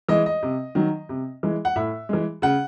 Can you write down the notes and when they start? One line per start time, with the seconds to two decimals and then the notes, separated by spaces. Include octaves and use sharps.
0.09 E3 G#3 D#5
0.26 D#5
0.43 C3
0.75 D#3 F#3
1.09 C3
1.43 E3 G#3
1.65 F#5
1.76 A2 E5
2.09 E3 G#3
2.42 C#3 F#5